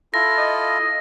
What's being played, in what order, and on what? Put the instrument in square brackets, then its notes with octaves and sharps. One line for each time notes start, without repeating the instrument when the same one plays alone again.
[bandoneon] E4 F4 A4 [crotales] A#6
[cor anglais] D#5